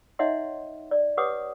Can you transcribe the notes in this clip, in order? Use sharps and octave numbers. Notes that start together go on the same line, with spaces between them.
D#4 C#5 D#5 E5 F#5 C6
D5
G4 B4 C#5 F#5 D6 D#6